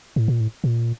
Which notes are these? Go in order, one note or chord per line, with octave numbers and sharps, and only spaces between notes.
A2
A#2
A2
A#2